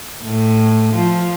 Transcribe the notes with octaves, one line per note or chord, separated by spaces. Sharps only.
A2
F3